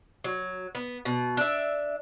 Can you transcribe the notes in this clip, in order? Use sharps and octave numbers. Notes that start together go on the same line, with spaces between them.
F#3
B3
B2
D4 E5